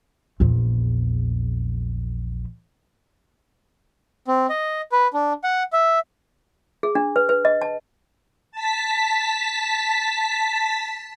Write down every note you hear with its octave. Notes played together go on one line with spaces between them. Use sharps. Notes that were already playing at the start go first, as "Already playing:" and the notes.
A#1 E2
C4
D#5
B4
D4
F#5
E5
G#4
D4
B4
B4
D#5
A5
A5 B6